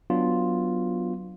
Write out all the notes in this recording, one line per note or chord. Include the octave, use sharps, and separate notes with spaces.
F#3 B3 D4 F4